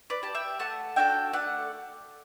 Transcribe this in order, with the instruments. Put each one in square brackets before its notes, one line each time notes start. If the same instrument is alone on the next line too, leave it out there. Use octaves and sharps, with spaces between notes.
[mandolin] B4 D5
G4 A5
E5 G5
A3 F#5 A5
D4 F#4 A4 E5 G5
A3 D5 F#5